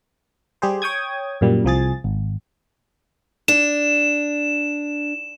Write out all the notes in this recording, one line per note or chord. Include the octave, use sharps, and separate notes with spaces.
G3 G4 G#4 C5
C#5 G5 D#6 G#6
F#2 A#2 G3
C2 F3 G#4 A6
G#1
D4 E7